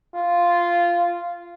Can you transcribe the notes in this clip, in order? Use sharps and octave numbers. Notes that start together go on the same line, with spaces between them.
F4